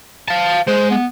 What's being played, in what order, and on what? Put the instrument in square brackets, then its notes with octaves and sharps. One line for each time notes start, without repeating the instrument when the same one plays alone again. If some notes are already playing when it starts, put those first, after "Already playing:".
[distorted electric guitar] F5 A5
[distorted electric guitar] G#3 [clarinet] C5
[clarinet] B3